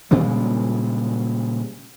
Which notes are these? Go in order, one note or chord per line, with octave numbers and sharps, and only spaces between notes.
A#2 C#3 G3 G#3